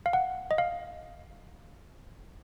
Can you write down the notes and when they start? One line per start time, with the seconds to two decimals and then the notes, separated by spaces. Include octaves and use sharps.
0.06 F5
0.13 F#5
0.51 D#5
0.58 F5